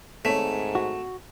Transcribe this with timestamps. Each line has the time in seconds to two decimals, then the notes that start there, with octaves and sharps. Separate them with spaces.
0.25 G#1 G#2 A3 C#5 B6
0.75 F#4